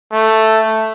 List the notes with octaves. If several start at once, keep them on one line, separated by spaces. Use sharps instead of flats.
A3